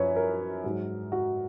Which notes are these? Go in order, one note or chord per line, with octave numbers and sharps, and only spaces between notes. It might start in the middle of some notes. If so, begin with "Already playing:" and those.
Already playing: F#2 F3 B4 C#5
A#4
G#2 F#3
F#4